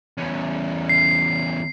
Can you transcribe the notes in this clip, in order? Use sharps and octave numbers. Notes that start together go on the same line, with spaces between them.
E2 C#4
C7